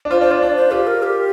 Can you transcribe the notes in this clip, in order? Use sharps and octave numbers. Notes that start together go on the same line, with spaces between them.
D4
F4 C5
D4 C5
F4 D5
D4 D5
C5
F4 G4
A#4
G4